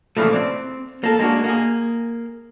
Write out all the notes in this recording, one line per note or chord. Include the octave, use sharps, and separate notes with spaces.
A#2 C#3 E3 F3 A3
C4 D5
A#3 A4
G#3 A#3 C#4 D4 F#4
A#3 G#4